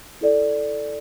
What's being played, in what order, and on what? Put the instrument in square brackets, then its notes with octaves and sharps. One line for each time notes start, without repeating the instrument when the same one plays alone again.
[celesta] E4 A4 D5